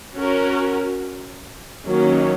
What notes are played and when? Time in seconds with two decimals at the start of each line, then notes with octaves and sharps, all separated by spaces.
0.16 C#4 F#4 A#4
1.87 D#3 F#3 A#3 C#4